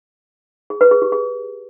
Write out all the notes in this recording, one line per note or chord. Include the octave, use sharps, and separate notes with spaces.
G#4
B4
G#4
G4
G#4